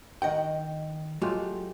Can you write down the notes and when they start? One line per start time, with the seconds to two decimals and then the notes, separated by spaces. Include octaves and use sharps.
0.22 D#3 D#5 F#5 G5
1.21 F#3 G#3 A3 F4 G4